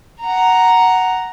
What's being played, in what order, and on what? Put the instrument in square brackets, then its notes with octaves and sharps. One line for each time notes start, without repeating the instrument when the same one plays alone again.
[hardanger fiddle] F#5 A#5